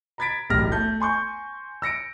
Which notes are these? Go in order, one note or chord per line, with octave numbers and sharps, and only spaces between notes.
A#5 B5 G#6 A6 B6 D7
E1 B1 A2 G4 F6 A#6
A3 A5 G6
G#5 C6 C#6 G6
E6 A#6 C#7 D7